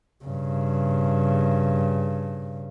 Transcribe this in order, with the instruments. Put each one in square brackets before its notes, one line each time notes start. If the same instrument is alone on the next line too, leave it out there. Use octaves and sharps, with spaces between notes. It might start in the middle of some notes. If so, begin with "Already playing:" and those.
[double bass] G2 C#3